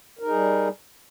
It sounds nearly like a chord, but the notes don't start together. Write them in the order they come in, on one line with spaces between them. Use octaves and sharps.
A#4 D#4 G#4 G3